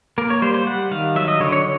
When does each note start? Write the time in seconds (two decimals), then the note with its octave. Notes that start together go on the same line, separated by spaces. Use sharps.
0.18 A#3 A#4
0.30 C#5
0.42 G3 C5
0.54 C5
0.67 G3 F#5
0.91 D#3 F5
1.16 F#3 E5
1.28 D#5
1.40 D3 C#5
1.52 C#5